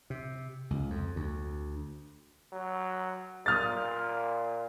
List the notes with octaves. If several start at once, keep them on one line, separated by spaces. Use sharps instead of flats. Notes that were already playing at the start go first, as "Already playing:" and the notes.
C3
C#2
F2
D2
F#3
A#2 D#6 F6 A6